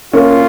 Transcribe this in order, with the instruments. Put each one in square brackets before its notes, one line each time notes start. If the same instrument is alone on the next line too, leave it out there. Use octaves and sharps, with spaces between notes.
[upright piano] A#3 C#4 [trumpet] F4